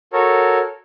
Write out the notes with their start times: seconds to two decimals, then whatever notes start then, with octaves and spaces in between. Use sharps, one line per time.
0.13 F#4 A4 A#4 C#5